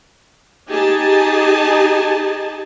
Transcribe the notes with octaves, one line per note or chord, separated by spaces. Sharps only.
D#4 G4 G#4 D#5 G#5 A5